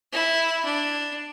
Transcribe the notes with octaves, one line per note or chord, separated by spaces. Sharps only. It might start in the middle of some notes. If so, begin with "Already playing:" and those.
E4
D4